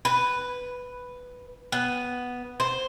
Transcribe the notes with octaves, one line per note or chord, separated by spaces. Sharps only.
B4
B3
C5